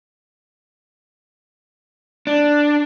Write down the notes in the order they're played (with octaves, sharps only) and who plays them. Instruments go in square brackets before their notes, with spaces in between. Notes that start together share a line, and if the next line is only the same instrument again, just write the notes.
[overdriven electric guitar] D4